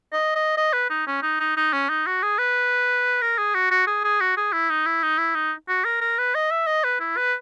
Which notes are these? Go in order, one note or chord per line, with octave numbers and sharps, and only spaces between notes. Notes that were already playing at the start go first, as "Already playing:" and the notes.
D#5
D#5
D#5
B4
D#4
C#4
D#4
D#4
D#4
C#4
D#4
F#4
G#4
B4
A#4
G#4
F#4
F#4
G#4
G#4
F#4
G#4
E4
D#4
E4
D#4
E4
D#4
F#4
A#4
A#4
B4
D#5
E5
D#5
B4
E4
B4